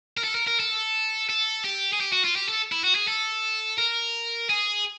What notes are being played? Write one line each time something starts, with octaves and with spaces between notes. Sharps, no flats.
A#4
A4
A#4
A#4
A4
A4
G4
G#4
G4
F#4
F4
G4
A4
E4
F#4
G#4
A4
A#4
G#4